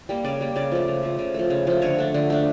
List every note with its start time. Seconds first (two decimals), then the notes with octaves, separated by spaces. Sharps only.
0.09 G3 A#3
0.24 C#3 D5
0.41 G3 A#3
0.56 C#3 D5
0.72 F3 A3
0.88 C#3
1.03 F3 A3
1.19 C#3
1.34 F3 A3
1.50 C#3
1.67 F3 A3
1.82 D3 C#5
1.98 A3 D4
2.14 D3
2.30 A3 D4